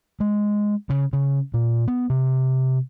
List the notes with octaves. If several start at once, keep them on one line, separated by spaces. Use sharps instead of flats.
G#3
C#3
C#3
A#2
B3
C3